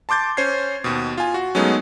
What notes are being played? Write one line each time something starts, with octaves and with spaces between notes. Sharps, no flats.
A5 C6 D6 G6 A6
C#4 C5 C#5 G#6 C7
D#2 B2
F4 G#5
F#4
F#3 G#3 A3 B3 C#4 D#4